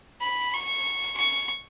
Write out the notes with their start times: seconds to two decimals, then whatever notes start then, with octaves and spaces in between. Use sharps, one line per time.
0.22 B5
0.54 C#6
1.17 C#6